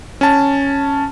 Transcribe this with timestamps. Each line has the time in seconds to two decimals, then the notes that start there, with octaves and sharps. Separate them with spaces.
0.21 C#4 A5